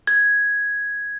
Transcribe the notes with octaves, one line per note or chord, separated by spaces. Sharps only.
G#6